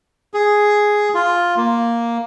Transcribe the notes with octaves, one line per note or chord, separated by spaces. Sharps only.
G#4
F4
A#3